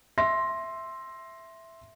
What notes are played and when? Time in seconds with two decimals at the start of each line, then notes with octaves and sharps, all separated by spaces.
0.18 E5 C6 A#6